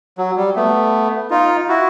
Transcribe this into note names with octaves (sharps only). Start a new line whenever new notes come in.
F#3
G3
A3 B3
D#4 F4
E4 F#4